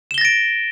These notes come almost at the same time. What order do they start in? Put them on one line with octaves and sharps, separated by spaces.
E7 G7 A#6 A6 D7